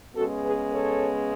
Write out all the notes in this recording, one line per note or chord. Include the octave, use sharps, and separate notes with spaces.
C#3 G#3 B3 F#4 A4
G#4 B4
A4 C#5